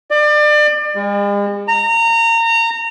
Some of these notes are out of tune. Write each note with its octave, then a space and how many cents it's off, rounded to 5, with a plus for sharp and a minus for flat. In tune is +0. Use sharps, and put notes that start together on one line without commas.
D5 +30
G#3 -45
A#5 -25